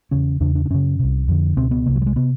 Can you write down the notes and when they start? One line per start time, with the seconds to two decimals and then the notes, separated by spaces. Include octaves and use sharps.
0.11 E2 C#3 C#4
0.40 E2 C#3 D4
0.55 D4
0.66 D4
0.70 F#2 C#3 C#4
0.99 C2 C3
1.28 F2 D3
1.57 C#2 B2 C4
1.71 B3
1.86 C2 C3 A#3
1.96 F#3
2.02 G3
2.06 G#3
2.16 C3 B3